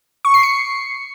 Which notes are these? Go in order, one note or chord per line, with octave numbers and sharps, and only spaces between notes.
C#6
C7
C#7